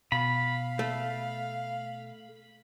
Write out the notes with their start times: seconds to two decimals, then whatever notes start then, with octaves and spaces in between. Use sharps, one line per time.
0.12 B2 F5 B5
0.79 A3